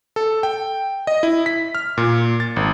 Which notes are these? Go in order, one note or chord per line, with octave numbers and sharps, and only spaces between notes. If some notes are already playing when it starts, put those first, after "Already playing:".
A4
G5
D#5
E4
B6
F6
A#2
A6
G#1